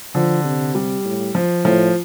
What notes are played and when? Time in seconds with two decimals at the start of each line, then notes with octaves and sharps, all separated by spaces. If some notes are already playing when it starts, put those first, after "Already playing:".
0.15 D3 F3
0.44 C3
0.75 G3
1.05 A2
1.35 F3
1.64 A2 F3